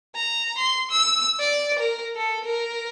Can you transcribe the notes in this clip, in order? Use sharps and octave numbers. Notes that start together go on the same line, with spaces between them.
A#5
C6
E6
D5
A#4
A4
A#4